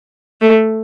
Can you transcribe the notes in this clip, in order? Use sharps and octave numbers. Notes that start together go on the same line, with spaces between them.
A3